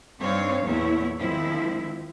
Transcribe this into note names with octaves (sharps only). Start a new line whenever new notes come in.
G2 C4 D4 D#4 C#5 F5
E2 A#2 A3 E4 C#5
D#3 F3 G#3 C4 E4